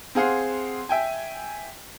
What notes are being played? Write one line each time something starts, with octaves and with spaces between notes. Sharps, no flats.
C4 G#4 F5 F#5 C6
E5 G5 G#5